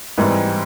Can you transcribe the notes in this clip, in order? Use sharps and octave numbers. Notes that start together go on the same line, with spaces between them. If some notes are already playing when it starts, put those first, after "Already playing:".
G#2 E3 G3 C4